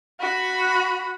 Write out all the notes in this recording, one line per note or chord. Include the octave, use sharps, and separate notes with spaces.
F#4 B5